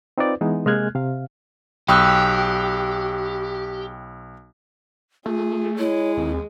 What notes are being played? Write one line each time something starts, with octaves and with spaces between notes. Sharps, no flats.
C4 D#4 F4 B4 D5
E3 G#3 B3 D#4
C3 G#3 A#3 F6 F#6 G#6
C3 F5
B1 G4 G5 B5 C#6 D#6 E6 F#6
A3 F4 G#4
G#3 E4 C#5
D#2 C4